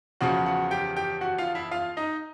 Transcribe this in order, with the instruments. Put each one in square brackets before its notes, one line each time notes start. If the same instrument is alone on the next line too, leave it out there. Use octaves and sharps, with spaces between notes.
[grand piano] E2 C#3 F3 F#4 F#5
F#4 F#5
G4 G5
G4 G5
F#4 F#5
F4 F5
E4 E5
F4 F5
D#4 D#5